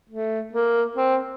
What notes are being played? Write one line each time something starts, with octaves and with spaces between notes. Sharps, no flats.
A3
A#3
C4